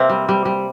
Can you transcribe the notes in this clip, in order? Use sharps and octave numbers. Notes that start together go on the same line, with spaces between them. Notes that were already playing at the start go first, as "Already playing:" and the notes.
Already playing: C3 A#3 C4
G3
G3
G3